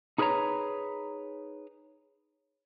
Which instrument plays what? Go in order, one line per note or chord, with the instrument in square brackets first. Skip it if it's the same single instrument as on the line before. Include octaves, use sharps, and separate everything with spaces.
[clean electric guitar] D#4 G#4 A#4 B4 C#5 A#5